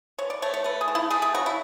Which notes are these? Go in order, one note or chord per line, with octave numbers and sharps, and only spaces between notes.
E3 C#5
D5
A3 C#5
C#5
A3 B4
G#4
E3
E4
A3 G#4
G#4
C#3 F#4
E4